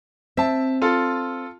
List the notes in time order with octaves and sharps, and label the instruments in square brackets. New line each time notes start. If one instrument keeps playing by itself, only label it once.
[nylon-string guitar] C4 [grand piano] E5 A5
[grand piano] F4 A4